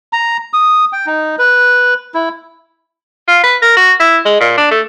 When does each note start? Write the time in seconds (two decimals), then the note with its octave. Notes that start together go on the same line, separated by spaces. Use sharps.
0.13 A#5
0.53 D#6
0.93 G5
1.06 D#4
1.39 B4
2.14 E4
3.28 F4
3.44 B4
3.62 A#4
3.77 F#4
4.00 E4
4.25 G#3
4.41 A#2
4.57 D4
4.71 A3